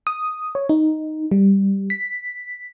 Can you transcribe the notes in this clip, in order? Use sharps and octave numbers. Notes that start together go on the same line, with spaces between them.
D#6
C#5
D#4
G3
B6